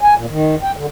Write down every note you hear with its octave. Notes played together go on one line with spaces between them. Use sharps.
G#5
A#2
D#3
G5
D3